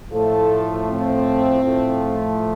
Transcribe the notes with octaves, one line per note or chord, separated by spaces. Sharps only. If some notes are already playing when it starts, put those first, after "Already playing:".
A2 F3 A3 A4
C4
A2 F3 A3